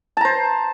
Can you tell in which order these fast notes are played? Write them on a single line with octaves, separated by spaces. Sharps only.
A5 A#5 C5